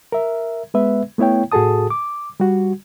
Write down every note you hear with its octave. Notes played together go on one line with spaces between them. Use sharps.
A#4 E5
G#3 B3 B4 E5
A3 B3 E4 C#5 G5
A2 F#4 G#4 A4 A5 D#6
D6
G3 F#4